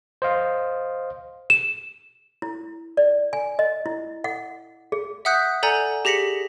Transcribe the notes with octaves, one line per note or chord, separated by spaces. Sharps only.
C5 D#5 F5
E7
E4
D5
G#5
D#5
E4
F#5
G#4
E5 F#5 D#6 F#6 G6 B6
A4 D5 F#5 G#5 A#5 G6
G4 G#4 A#6 B6 C#7 F#7